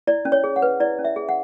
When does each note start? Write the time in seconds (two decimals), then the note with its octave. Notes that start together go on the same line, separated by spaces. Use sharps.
0.07 E4 D5
0.25 C#4
0.32 C#5
0.44 G#4
0.56 F#5
0.62 B4
0.80 E4 D5
0.99 C#4
1.05 E5
1.16 G#4
1.29 F#5